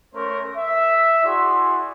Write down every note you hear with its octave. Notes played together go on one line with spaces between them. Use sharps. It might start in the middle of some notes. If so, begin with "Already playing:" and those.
A3 C#4 A#4 C5 C#5
E5
E4 F#4 G#4 D5 C6